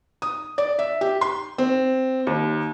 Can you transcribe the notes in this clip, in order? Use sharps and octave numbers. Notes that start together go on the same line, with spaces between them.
D#6
D5
E5
G4
C6
C4
D#2